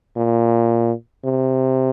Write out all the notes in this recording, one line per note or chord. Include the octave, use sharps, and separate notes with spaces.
A#2
C3